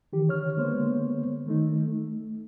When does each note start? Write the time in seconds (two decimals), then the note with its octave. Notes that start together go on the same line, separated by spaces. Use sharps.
0.13 D#3 E3 G4
0.28 D3 C#5 F6
0.57 D3 G#3 A#3 B3 C5 C#5
1.46 D#3 A3 D#4
1.88 A3